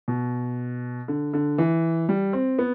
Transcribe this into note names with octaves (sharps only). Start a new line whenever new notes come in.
B2
D3
D3
E3
G3
C4
B3